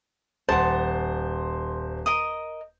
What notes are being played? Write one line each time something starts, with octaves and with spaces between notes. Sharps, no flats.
D#1 C5 F#5 A5
A#4 D#5 D#6